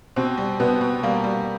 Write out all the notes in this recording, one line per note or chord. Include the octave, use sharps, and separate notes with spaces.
B2 C4
G3
B2 B3
B2
G3 A#3
G3